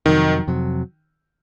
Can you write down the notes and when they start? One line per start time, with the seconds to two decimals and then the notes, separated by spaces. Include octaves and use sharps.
0.06 F2 C3 D#3 F#3
0.48 F2 C3 F#3